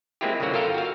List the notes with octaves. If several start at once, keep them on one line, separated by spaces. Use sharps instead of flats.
G#3 A#3 C4 E4 F4 G4
G1 C2 C#3 F#3 A#3 F#4
F4 A4 A#4 F5 G5
F#4 F5